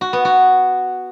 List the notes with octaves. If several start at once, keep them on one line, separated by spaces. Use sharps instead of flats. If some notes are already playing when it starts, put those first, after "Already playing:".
F#4
B3
F#4